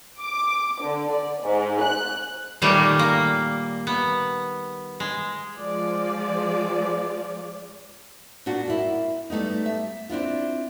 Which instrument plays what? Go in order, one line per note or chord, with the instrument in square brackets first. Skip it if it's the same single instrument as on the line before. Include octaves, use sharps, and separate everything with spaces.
[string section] D6
D3
D5
G#2
F#6
[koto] A#2 D#3 G3 A3 A#3
A#3
B3
G#3
[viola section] F3 G#3 D5
[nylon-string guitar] A#2 D4 F#4
A#3 E4
G3 A3 B3 D#4
E5
C4 D4 E4 F4